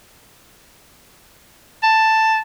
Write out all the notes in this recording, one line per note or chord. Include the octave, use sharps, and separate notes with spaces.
A5